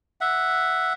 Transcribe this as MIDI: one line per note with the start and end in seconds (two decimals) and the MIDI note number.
0.21 0.93 76
0.21 0.93 78